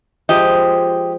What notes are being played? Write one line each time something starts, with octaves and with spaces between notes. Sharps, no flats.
F3 G#3 G4 D#5